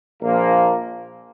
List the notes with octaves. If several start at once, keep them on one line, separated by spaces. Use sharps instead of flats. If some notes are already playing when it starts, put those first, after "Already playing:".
A#1 A#2 F3 A#3